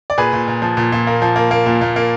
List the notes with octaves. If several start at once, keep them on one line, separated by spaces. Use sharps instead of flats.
D5
A#2 G#4 B4
A#2
A#2
F3
A#2
A#2
A#3
F3
A#3
A#3
A#2
A#2
A#3